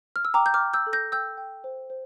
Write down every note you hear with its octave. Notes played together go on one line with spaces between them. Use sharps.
F6
E6
G5 A#5 D6
G6
D6 F6
G5
E6 G6
A4
G6 A#6
G5 E6 G6
G5
C5
C5